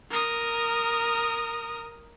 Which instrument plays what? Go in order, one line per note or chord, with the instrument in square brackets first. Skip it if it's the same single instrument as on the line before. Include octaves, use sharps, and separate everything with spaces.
[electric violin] A#4 D#6